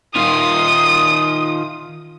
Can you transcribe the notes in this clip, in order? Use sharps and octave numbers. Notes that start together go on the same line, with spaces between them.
D#3 F4 D#6